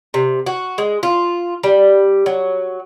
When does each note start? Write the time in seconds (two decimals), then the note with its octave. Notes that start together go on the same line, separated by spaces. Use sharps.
0.14 C3
0.46 F#4
0.78 G#3
1.03 F4
1.64 G3
2.26 F#3